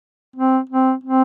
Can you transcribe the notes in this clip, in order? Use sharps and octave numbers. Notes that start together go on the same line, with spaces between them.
C4
C4
C4